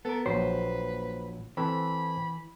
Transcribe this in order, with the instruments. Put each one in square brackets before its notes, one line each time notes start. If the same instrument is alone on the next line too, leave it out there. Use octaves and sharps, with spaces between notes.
[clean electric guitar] B3 A#4 [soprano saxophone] A4
[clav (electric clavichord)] A#1 F#3 [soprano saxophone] B4 [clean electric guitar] C5
[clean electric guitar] E3 [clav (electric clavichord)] C4 A4 B4 [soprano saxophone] B5